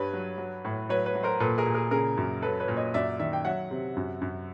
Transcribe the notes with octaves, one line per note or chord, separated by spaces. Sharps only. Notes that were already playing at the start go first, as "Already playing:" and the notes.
Already playing: G2 B4 C#5
F#3
F#3
A2
F#3 B4 C#5
B4 C#5
F#3
A#4 C5
A#2 A4 B4
G#4 A#4
A#2
G#4 A#4
C#3 G#4 A#4
F#2
F#3 A4 B4
B4 C#5
A#2
C#5 D#5
F#2 D5 E5
D#3 D5 E5
G5
F#3 E5 F#5
C3
F#2
F#2